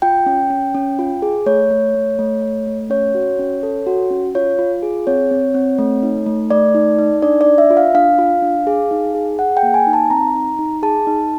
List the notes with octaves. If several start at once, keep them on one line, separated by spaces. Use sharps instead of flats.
F4 G5
C#4
C#4
C#4
F4
G#4
A3 C#5
A3
A3
A3
A3
A3
C#4 C#5
F#4
C#4
A4
F#4
C#4
F4 C#5
F4
G#4
C4 C#5
C4
C4
A3
D#4
A3
A3 D5
D#4
D#4
D4 D5
D5
D4
E5
F4
F5
D4 F5
F4
D4
G#4
D#4
G#4
G#4 F#5
G5
A#3
G#5
D#4
A5
C4 A#5
D#4
D#4
G#4 A5
D#4